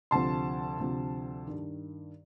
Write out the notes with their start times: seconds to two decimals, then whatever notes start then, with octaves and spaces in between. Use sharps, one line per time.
0.11 D2 C3 F3 A5 C6
0.79 D2 C3 F3
1.46 G2 D#3